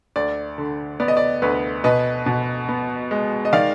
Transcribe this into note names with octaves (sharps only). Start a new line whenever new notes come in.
D2 D5
D3
B3 D5
D#5
D5
D2 B4
B2 B4 D#5
B2
B3
G#3
D#5
D#3 D5 F5